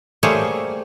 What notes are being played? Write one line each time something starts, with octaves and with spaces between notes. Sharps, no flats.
G3 A3 A#3 G#4 C5 C#5